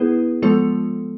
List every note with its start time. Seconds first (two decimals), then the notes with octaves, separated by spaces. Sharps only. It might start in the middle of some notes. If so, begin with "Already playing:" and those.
Already playing: B3 E4 G#4 B4
0.42 F3 G#3 B3 F4 A4